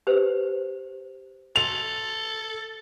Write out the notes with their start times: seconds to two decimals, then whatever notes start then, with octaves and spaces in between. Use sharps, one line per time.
0.07 G4 B4 C5
1.56 A4 C6 F7